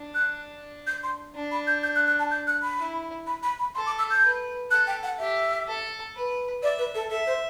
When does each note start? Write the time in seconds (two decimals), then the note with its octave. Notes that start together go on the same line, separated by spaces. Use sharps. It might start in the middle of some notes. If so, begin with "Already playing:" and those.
Already playing: D4
0.15 F#6
0.87 G6
1.03 C6
1.35 D4
1.51 B5
1.67 G6
1.83 G6
1.96 F#6
2.07 F#6
2.19 A5
2.31 G6
2.47 F#6
2.63 B5
2.79 E4
3.27 B5
3.43 B5
3.59 B5
3.75 A4 C6
3.86 D6
3.99 E6
4.11 G6
4.23 B4
4.70 A4 F#6
4.87 G5
5.03 F#5
5.19 G4 E5
5.67 A4
6.15 B4
6.63 D5 E5
6.78 B4
6.95 A4
7.10 A4 E5
7.27 C5